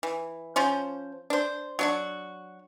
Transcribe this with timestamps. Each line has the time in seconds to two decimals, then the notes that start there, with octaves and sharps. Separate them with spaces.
0.03 E3
0.56 F3 C#4 C5
1.30 D4 C5
1.79 F#3 D4 F#4